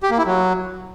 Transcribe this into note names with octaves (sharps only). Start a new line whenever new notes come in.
G4
A#3
E4
F#3